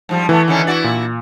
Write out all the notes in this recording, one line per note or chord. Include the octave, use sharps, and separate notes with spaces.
G#2 F3 G3
E3 A3 B3
D3 D#3 C#4
E4 F#4 D5
A#2